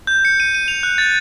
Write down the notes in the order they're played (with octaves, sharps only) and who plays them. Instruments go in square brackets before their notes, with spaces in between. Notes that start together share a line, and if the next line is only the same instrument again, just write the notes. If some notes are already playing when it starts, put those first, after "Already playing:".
[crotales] G6
C#7
D#7
D#7
F7
F#6
A6